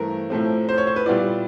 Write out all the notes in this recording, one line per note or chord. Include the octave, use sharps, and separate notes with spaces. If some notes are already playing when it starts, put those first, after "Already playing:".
Already playing: G2 E3 A3 C4 A#4
A2 F3 A3 C4
C5
C#5
C5
B4
A#2 G3 B3 E4 D5